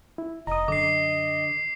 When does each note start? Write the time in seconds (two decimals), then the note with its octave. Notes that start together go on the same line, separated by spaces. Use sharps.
0.18 E4
0.47 F1 D#5 A#5 D#6
0.68 F#2 D3 D6 C7